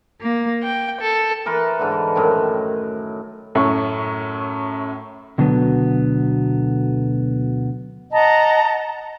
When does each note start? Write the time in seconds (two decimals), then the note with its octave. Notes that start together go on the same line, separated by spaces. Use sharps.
0.20 A#3
0.65 G5
1.02 A4
1.46 E3 A#4 B4 C6
1.79 G#2 D3 E3
2.15 F#2 A2 D#3 C6
3.55 F#2 A2 C#6
5.38 D2 B2 D3 F#3 B3
8.12 D#5 F#5 A5 A#5